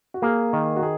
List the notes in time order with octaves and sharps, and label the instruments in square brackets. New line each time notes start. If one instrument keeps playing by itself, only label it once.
[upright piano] F#4
[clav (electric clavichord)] A#3 [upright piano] G#4
[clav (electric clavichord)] D#3
[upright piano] F#4
G#4